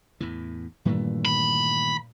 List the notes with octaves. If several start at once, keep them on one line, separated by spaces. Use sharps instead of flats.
E2 A2 E3
G2 A#2 D#3 E3 A3
B5